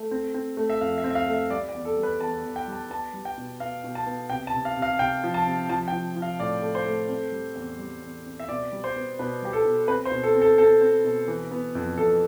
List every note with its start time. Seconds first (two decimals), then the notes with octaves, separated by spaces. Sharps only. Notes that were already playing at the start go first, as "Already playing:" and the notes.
Already playing: A3
0.11 C4
0.34 C4
0.57 A3
0.70 E5
0.81 F2 F5
0.98 E5
1.04 C4
1.10 E5
1.15 F5
1.27 A3
1.33 E5
1.50 G3 D5
1.69 D5
1.74 E2
1.85 A4
1.97 G3
2.03 B4
2.21 E2 A5
2.44 E2
2.56 G5
2.68 G3
2.73 A5
2.90 B3 A5
3.14 G3
3.25 G5
3.37 B2
3.60 B3 F5
3.84 B2
3.95 A5
4.06 B3
4.30 C3 G5
4.47 A5
4.54 C3
4.65 F5
4.77 C3
4.82 F5
4.99 C3 G5
5.24 F3
5.34 A5
5.47 C3
5.69 F3 A5
5.88 G5
5.92 F3
6.16 F3
6.22 F5
6.40 A2 D5
6.62 A3
6.75 C5
6.86 A3
7.09 C4
7.32 G3
7.56 E2
7.79 G3
8.02 E2
8.26 C4
8.40 E5
8.49 B2 D5
8.72 G3
8.84 C5
8.96 B3
9.19 B2 B4
9.42 G3 G4
9.53 A4
9.65 B2
9.88 C4 B4
10.05 C5
10.11 B2
10.23 A4
10.35 C4
10.41 A4
10.58 C4 A4
10.81 C4
11.05 B2
11.28 E3
11.51 B3
11.75 F2
11.97 F2 A4